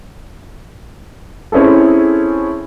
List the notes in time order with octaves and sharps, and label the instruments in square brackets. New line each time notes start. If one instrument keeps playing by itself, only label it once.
[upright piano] C4 C#4 E4 G#4 A4